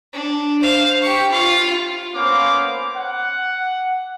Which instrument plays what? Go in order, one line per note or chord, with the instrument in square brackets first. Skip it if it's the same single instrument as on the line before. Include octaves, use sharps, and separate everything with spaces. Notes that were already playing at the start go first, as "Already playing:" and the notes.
[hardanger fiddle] D4
C5 F5
G4 C#6
F4 F5
[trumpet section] A#3 B3 C#4 C5 F5 D6
F#5